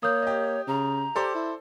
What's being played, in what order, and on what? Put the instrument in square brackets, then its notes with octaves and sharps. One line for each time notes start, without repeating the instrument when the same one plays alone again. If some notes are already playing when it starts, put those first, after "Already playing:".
[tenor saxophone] A#3 [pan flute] C#5 [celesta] D#6 G6
[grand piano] G4 D#5
[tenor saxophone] C#3 [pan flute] A#5
[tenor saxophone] G4 [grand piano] A4 C5 D5
[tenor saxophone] E4